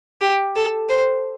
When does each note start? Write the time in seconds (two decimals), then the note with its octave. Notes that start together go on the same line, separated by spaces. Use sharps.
0.21 G4
0.55 A4
0.89 C5